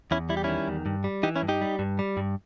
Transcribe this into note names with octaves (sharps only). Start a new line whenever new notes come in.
E2 C#4 E4
G3 E4
G4
D#3 C#4 E4
E2
G2
G3
E3 D#4 G4
C#4 E4
G2
D#4 G4
G3
G2
G3
G2